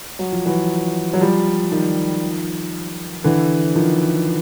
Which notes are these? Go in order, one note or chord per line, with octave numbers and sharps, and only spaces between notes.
F#3
F3
E3 F#3
F#3
F3 G3
D#3 F3
D3 E3
D#3 F3